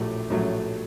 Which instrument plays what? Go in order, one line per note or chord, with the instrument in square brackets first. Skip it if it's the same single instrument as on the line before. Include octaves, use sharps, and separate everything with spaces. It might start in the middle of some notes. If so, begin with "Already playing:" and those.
Already playing: [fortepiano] A#1 A2 F#3 A3 G4
A#1 A2 F#3 A3